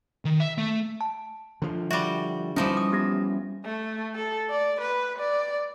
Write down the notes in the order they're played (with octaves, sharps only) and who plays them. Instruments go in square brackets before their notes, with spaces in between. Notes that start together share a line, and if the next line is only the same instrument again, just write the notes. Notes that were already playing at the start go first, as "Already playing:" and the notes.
[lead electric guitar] D#3
E5
A3
[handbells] A5
[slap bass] D3 F3
[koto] G3 F#4 [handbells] E5
[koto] E3 F3 D#4 [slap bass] G3 C#4
[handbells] D#6
B3 G4 A#6
[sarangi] A3
A4
D5
B4
D5